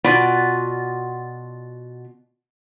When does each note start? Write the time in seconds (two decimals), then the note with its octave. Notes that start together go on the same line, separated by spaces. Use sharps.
0.04 B2 B3 F4 D5